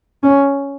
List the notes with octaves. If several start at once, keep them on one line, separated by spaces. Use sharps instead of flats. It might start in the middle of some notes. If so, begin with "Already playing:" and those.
C#4